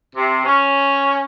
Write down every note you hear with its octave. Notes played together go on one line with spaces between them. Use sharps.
C3
C#4